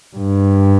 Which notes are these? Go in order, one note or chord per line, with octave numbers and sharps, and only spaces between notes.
G2